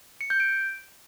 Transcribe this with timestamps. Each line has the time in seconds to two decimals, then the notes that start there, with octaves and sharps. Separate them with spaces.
0.21 C#7
0.30 G6
0.40 D7